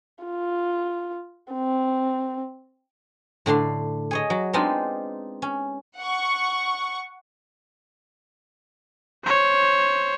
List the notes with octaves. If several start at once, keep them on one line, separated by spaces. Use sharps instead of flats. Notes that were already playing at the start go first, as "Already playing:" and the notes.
F4
C4
A2 D3 D4 C6
G#4 C#5 D#5
F#3
G#3 B3 C4 D4 D#4 F4
C#4
F#5 C#6
C5 C#5